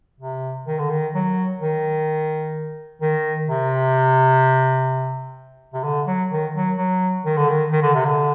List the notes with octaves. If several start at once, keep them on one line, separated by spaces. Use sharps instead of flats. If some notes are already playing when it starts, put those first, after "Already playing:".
C3
D#3
D3
D#3
F#3
D#3
D#3
C3
C3
D3
F#3
D#3
F#3
F#3
D#3
D3
D#3
D#3
D3
C3
D3